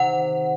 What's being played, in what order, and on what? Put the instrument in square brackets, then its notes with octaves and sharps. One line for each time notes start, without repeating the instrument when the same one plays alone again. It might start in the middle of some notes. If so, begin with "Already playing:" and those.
Already playing: [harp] C3 D#3 [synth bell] F#5